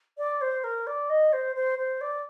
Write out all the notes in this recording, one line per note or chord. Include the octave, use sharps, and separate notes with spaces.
D5
C5
A#4
D5
D#5
C5
C5
C5
D5